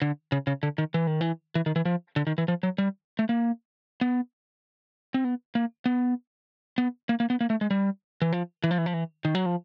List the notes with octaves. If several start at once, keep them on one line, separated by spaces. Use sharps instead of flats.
D3
C#3
C#3
D3
D#3
E3
D#3
E3
E3
D#3
E3
F3
D3
D#3
E3
F3
F#3
G3
A3
A#3
B3
C4
B3
A#3
B3
B3
A#3
A#3
B3
A#3
A3
G#3
G3
E3
F3
E3
F3
E3
F3
E3
D#3
F#3
F3